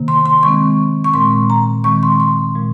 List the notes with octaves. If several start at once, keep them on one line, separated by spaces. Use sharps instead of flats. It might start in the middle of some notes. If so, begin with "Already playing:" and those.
Already playing: C3 D#3 A#3
C6
C6
D#3 G#3 C4 C#6
C#6
A#2 G#3 C4 C6
A#5
D#3 G#3 C4 C#6
C6
C6
A#2 F3 G#3